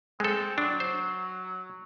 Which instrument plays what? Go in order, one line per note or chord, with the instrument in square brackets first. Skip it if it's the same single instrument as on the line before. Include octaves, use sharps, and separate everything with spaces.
[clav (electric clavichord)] G#3 A4 [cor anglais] C4
[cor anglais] F#3 [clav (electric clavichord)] D4
[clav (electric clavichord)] C5